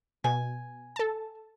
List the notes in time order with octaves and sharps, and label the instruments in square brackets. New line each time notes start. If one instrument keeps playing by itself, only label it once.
[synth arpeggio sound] B2 [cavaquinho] G#5
[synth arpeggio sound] A4 A5